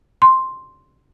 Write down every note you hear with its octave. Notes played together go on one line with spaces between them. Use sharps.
C6